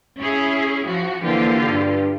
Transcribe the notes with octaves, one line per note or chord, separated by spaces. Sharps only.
C#4 E4 G#4
F3 F#4
D3 E3 F3 A#3 F4 G4
G2